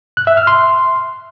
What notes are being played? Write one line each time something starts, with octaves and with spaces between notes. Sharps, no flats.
F#6
E5
F6
C6